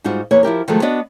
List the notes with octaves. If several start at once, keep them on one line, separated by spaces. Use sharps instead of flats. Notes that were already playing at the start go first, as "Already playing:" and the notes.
G#2 G3 D#4 F4 F#4
E2 A#3 B4 C#5
F3 E4 G4 A#4
D#3 F3 F#3 G#3 A3 A4
B3 D4 F#4 D5 D#5